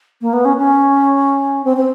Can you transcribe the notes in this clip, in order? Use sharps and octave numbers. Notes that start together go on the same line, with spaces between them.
A#3
B3
C#4
C#4
C4
C4